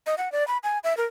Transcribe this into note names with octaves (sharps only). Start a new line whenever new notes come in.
D#5
F#5
D5
B5
G#5
E5
A#4